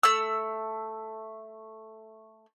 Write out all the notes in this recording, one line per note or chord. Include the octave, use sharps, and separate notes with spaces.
A3 E6